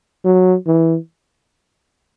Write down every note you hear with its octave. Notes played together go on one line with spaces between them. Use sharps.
F#3
E3